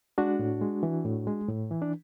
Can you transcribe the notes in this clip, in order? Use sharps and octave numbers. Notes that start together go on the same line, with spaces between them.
G#3 D4 F#4
A2
G#3
E3
A2
G#3
A2
E3
D4